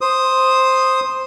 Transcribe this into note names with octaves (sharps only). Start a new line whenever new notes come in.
C5 D#6